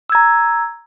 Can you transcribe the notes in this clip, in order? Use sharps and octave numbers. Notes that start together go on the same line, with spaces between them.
A#5 E6 G#6